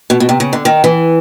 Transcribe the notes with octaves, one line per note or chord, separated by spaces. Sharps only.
B2
B2
C3
C#3
D3
D#3
E3